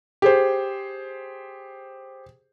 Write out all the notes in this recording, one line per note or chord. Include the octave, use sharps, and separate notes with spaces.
G4 G#4 C5